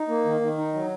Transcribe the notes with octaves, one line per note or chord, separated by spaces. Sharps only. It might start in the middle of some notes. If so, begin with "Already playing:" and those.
Already playing: D#4
A#3
D#3
D#3
D#4
F#3